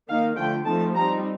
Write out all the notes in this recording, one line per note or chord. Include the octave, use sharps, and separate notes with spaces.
D#3 A#3 D#4 F5
D3 F3 A3 G5
F3 A3 C4 D#4 A5
G3 C4 D#4 A#5